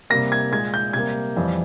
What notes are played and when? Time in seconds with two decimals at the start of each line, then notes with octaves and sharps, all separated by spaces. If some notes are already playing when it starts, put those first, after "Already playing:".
0.10 C3 G3 A#3 A#6
0.32 G#6
0.52 A#2 G#3 G#6
0.74 G6
0.93 C3 G3 A#3 G#6
1.36 F2 E3 G3